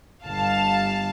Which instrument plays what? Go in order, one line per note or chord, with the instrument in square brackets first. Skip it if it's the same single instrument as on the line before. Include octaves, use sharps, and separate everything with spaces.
[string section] G1 F5 A5